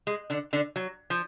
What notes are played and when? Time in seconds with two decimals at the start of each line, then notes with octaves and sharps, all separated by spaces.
0.07 G#3
0.30 D3 D4
0.53 D3 D4
0.76 F#3
1.10 F3